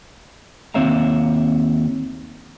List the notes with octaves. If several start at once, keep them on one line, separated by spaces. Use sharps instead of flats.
D#2 C4 C#5 E5 F5 A#5